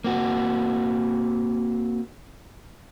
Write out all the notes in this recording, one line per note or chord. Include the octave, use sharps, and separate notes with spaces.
A#3 C4 F#4